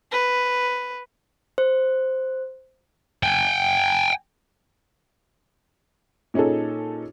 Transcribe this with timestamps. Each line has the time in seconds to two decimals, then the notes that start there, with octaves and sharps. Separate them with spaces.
0.11 B4
1.58 C5
3.23 G5 G#5
6.34 A#2 C#4 D#4 G#4 A4